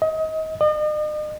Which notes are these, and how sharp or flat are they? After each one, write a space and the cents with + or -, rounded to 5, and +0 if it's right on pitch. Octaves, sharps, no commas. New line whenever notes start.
D#5 +30
D#5 -40